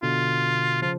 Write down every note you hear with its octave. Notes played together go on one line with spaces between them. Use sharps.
B2 D3 F4
C#3 F3 F4